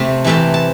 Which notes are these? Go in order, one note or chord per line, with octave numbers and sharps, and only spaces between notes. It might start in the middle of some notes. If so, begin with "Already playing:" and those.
Already playing: C3 A3 C4 A5
C3 E3 A3 C4 A5
A5